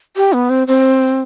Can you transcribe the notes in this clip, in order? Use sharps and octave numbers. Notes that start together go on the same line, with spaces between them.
G4
B3
C4
C4